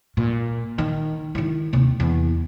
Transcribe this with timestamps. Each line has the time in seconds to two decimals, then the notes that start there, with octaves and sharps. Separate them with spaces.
0.17 A#2
0.78 D#3
1.35 D#3 E4
1.73 D#2 C3
2.00 E2